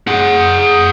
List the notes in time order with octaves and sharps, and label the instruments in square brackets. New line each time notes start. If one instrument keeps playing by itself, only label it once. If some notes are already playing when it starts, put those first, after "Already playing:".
[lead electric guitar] G#4 F#5